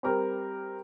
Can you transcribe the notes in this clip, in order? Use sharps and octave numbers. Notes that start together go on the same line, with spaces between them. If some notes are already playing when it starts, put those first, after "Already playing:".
G3 C4 G4 A#4